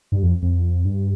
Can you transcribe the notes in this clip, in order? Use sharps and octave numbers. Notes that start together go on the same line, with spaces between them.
G2
F2
F2
G2